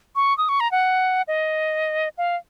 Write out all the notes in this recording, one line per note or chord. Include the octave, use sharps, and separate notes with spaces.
C#6
D#6
C#6
A#5
F#5
D#5
F5